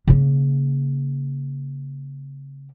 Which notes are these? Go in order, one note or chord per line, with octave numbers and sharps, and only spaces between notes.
C#3 A#3